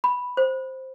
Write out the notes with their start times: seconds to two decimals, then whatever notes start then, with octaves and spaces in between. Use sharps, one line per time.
0.04 B5
0.37 C5